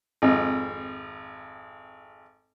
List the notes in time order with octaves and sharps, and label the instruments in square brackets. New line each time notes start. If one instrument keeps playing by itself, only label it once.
[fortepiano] G#1 F2